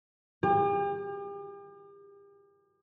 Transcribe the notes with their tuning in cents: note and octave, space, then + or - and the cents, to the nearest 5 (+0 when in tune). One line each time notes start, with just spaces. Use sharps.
G4 +40